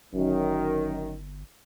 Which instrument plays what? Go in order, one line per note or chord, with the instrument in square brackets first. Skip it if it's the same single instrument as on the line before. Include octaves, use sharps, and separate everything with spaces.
[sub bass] G1 [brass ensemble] F#2 D#3